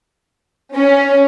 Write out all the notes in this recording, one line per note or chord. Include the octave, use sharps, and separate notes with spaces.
C#4